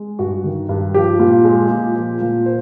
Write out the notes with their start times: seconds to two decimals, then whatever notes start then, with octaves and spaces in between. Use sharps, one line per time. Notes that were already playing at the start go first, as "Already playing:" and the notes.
Already playing: G#3
0.19 G2 F#4
0.44 D#3
0.69 G2
0.94 F3 G4
1.20 A#2
1.45 G#3
1.71 A#2
1.95 F3
2.21 A#2
2.46 C5